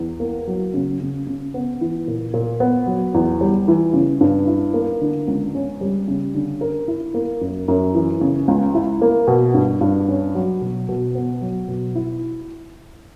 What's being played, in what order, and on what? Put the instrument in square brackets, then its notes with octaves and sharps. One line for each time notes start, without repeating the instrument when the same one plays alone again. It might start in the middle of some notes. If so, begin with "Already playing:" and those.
Already playing: [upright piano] E2
A#3
F#3
C#3
C#3
C#3
B3
E3
A#2
A#2
B3
F#3
E2
G3
E3
C#3
G2
E4
A#3
D3
C#2
C#4
G3
C#3
D3
A#4
E4
A#3
F#2
F#2
E3
C#3
C#2
E4
A#3
B2
G2
G2
C#4
F#3
B2
B2
B3
F#3
B2
E4